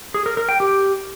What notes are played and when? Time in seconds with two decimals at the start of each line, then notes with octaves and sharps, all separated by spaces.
0.14 G#4
0.26 A#4
0.37 A#4
0.49 G5
0.60 G4